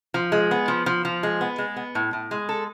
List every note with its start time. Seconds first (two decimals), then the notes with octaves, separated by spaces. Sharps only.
0.14 F3
0.32 G#3
0.51 B3
0.68 F3
0.86 F3
1.05 F3
1.23 G#3
1.41 B3
1.58 G#3
1.76 B3
1.95 A2
2.13 A2
2.31 G#3
2.49 A4